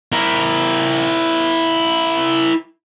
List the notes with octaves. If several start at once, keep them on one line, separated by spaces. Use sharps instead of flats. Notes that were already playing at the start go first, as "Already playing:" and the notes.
E4 A#4